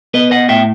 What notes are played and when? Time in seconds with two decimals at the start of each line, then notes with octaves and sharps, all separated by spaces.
0.14 B3 B4 D#5
0.31 D#5 F#5
0.49 A2 E5 G5